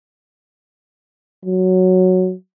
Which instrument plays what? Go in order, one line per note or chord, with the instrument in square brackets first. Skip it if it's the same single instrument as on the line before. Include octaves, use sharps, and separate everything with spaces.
[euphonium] F#3